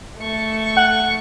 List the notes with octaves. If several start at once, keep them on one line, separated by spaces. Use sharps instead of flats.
A3 C#6
F#5